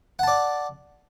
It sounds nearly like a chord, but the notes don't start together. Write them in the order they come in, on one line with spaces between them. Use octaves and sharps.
F#5 A5 D5